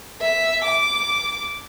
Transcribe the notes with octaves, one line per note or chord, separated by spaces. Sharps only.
E5
D6